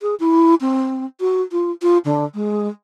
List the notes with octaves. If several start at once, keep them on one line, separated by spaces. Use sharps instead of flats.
G#4
E4
C4
F#4
F4
F4
D3
G#3